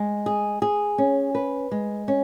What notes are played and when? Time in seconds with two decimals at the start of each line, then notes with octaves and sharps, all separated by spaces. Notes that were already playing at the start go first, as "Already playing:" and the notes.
Already playing: G#3
0.26 G#4
0.62 G#4
0.98 C#4
1.35 B4
1.71 G#3
2.08 C#4